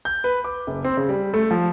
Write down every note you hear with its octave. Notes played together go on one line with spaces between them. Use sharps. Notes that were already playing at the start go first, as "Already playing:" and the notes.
G6
B4
D6
F#1
C4
C#3
G3
A3
F3